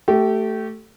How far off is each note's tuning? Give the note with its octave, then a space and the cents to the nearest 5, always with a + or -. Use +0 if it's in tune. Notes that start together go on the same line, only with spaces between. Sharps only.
A3 +0 G4 -25